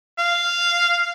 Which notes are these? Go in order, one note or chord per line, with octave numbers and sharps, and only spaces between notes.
F5